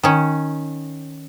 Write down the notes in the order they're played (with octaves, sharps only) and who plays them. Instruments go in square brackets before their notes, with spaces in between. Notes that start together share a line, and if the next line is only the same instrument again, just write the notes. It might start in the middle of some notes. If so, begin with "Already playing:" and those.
[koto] D#3 C#4